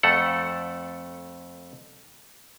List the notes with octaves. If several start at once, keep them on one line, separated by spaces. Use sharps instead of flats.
F2 A3 A4 F#5